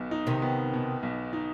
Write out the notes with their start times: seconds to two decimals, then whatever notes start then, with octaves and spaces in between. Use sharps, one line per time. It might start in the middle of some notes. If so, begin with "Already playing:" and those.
Already playing: B1 B2 B3
0.11 D#4
0.27 C3 D#3
0.42 B3
0.73 B2
1.03 B1
1.33 D#4